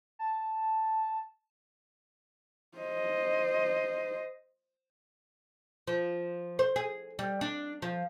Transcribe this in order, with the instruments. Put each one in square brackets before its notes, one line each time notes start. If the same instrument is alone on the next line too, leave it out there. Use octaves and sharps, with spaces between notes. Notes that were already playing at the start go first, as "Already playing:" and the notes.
[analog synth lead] A5
[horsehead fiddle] C5 D#5
[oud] F3
C5
G#4
G3
D4
F3